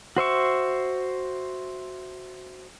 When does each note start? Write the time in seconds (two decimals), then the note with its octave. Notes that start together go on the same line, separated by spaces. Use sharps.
0.17 F#4 C5 E5 C#6